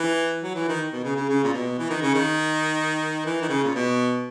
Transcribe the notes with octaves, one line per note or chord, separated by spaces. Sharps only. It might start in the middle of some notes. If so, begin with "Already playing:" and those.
Already playing: E3
F#3
E3
D#3
B2
C#3
C#3
C#3
A#2
B2
E3
D#3
C#3
D#3
E3
D#3
C#3
A#2
B2